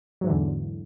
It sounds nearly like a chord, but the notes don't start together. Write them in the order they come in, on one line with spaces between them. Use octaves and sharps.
F#3 G#2 E3 D3 E2